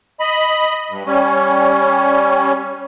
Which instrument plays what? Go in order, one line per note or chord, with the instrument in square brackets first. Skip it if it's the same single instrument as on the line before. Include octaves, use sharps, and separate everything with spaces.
[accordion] D#5 B5
G2
G3 C#4